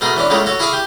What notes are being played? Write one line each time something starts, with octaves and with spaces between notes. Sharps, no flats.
B2 A3 G#4 A#4
E3 C#4 D4
C#2 C#3 A3 A#3 A4 C#5
F#4 A4 C#5
E4 G#4 E5 F5 C#6 D6
G4